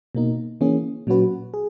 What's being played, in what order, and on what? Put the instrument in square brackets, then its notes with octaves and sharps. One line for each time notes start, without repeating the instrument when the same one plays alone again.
[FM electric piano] B2 A#3 D#4
E3 A#3 C#4 G#4
A#2 F#3 C#4 F#4 B4
G#4